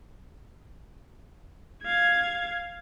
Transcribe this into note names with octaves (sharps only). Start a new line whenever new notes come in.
F5 G#6